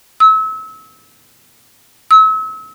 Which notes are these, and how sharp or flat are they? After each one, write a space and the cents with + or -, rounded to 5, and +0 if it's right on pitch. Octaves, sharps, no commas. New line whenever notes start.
E6 -30
E6 -35